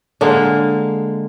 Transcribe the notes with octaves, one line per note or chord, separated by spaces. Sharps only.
D3 G#3 A#3